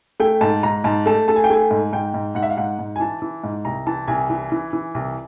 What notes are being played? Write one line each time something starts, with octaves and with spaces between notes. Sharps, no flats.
A3 G5
G#2 A5
G#2 A#5
G#2 A5
A3 A5
A3 A5
G#5
G5
A3 G#5
G#2
G#2 G5
G#2
G#2 F#5
E5
F5
G#2 F#5
G#2
G#5
E3 A5
E3
G#2
C2 A#5
E3 A5
C2 G#5
E3
E3
E3
C2